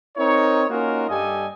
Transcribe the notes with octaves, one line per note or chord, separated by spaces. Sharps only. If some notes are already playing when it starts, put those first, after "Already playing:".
C4 D#4 A#4 C#5
A#3 C#4 D#4 F4 F#4 A#4
G2 G3 G4 A4 D#5 G#5